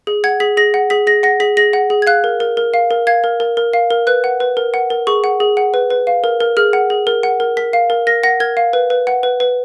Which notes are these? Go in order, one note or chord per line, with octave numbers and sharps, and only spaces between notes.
G#4
F#5 G#6
G#4 B6
G#4 A#6
F#5
G#4 B6
G#4 A#6
F#5 A#6
G#4 B6
G#4 A#6
F#5
G#4
G#6
F5 F#6
A#4
A#4
A#4
F5
A#4
F5 G#6
A#4
A#4
A#4
F5
A#4
B4 F#6
F#5
B4
A#4
F#5
A#4
G#4 C#6
F#5
G#4
F#5
B4
B4
F5
A#4
A#4
G#4 F6
F#5
G#4
A#4
F#5
A#4
A#4 B6
F5
A#4
A#4 A#6
F#5 A#6
A#4 G#6
F5
B4
B4
F#5
B4
B4